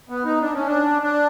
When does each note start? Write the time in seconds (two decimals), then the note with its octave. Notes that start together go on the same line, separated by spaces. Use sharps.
0.09 B3
0.25 D#4
0.41 D4
0.54 C#4
0.66 D4
1.02 D4